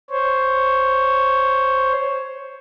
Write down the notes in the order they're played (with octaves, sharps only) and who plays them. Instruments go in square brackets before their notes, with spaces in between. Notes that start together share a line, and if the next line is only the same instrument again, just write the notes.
[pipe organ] C5 C#5